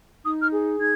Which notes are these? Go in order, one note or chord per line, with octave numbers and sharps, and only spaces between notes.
D#4 D#6
F6
G#4
D#4 G#6